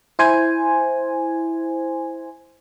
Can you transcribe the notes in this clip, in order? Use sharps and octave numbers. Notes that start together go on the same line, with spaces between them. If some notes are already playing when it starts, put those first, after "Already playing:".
E4 C5 G#5